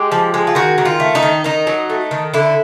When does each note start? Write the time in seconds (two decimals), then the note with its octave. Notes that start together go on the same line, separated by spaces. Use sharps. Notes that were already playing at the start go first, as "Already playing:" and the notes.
Already playing: G#3 G4
0.12 F3
0.34 G#3
0.47 F4
0.55 D#3 F#4
0.78 D#3
0.85 F4
1.00 A3
1.15 D#4
1.22 D#3
1.44 D#3 D#4
1.67 F#3
1.90 A3
2.11 D#3
2.34 D3 E4